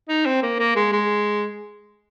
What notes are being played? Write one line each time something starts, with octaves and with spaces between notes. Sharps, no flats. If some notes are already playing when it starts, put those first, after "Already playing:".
D#4
C4
A#3
A#3
G#3
G#3